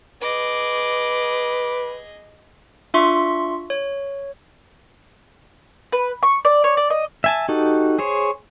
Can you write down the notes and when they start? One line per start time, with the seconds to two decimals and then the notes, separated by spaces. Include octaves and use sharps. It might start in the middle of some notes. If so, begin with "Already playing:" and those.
0.22 G#4 B4 D#5 D6
2.94 D4 F4 E5 C6 C#6
3.70 C#5
5.93 B4
6.23 C#6
6.45 D5
6.64 C#5
6.77 D5
6.90 D#5
7.24 E5 G#5 A5
7.49 D#4 F#4 G4 A4
7.99 G#4 C5 C#5